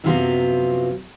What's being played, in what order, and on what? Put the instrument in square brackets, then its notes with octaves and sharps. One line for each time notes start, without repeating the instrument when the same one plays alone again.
[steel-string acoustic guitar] F#2 C3 F3 F#3 B3 F4